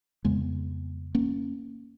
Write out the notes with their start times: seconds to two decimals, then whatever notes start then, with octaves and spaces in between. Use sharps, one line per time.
0.25 F2 C#3 G#3 B3
1.15 A#3 C#4